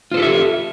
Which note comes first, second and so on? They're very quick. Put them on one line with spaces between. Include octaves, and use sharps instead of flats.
F4 C5 A4 G4 E5